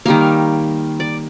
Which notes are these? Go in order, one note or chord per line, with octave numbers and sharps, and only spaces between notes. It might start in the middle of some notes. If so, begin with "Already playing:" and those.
D#3 G3 A#3 F5
D5